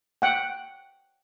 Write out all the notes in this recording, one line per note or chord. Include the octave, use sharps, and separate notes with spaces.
F#5 G5